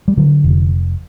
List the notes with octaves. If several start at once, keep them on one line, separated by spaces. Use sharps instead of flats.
G3
D3 F#3
F1